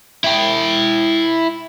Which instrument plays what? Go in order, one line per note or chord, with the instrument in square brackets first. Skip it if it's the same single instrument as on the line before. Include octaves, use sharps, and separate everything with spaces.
[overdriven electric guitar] E4 G5